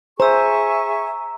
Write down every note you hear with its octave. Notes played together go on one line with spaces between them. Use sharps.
G#4 C5 E5 G#5 A#5 C#6 E6